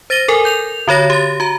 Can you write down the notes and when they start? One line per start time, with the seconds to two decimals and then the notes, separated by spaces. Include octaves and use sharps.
0.10 C5 A6 A#6 D#7 G7
0.28 A4 A#4 G#5
0.45 G6 F7
0.88 D3 F#4 C#5 A#6
1.10 G4 A6
1.40 F#4 A#5